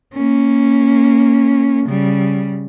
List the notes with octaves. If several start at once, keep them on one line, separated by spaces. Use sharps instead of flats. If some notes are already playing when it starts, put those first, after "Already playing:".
A#3 C#4
C#3 G3